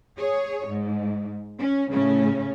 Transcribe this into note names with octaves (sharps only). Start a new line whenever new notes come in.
G#4 C#5
G#2
C#4
A2 C#3 C#4